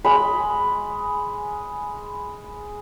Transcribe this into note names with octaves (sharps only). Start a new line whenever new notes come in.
G#3 B5